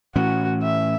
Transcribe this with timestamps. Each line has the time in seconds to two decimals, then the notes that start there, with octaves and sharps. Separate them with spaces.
0.16 A2 E3 C#4 F#4
0.63 E5